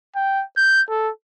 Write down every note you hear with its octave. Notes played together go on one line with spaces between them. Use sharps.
G5
G6
A4